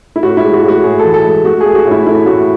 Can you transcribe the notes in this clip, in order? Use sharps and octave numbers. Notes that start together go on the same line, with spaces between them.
E4
A2 F#4
E4
G#3
F#4
A2
F#4
A2 G#4
E3 A4
A4
G#3
A3 F#4
A3 G#4
F#4
A2
E4
A3 E4
A2 F#4